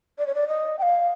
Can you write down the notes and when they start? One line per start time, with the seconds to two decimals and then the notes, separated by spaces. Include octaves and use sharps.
0.18 D5
0.26 C#5
0.35 D5
0.48 D#5
0.79 G5
0.82 F5